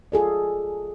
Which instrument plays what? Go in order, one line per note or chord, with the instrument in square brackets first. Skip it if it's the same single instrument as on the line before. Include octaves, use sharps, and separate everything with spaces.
[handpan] F4 G#4 A4 D5